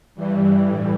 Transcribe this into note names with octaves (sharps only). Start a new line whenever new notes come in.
G2 E3 G3
A2 E3 G3